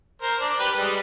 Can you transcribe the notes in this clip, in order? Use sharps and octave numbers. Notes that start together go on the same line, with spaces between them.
A#4 C5
D4
G4 B4
G3 G#3